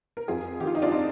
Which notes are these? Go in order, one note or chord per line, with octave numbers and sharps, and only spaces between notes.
A#4
F2 F4 G#4
D#3 G4
F4
D#4
D4 F4
C4 D#4